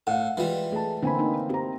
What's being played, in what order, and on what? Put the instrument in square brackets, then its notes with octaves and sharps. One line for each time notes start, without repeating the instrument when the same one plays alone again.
[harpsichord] A2 [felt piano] F5 F#5
[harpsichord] E3 G3 [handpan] G#3 [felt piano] F4
[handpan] A3 [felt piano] G#4 A5
[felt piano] D3 G#5 B5 [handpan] A#3 C4 E4
[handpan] A#3 D#4
[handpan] C4 [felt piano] G4 A#5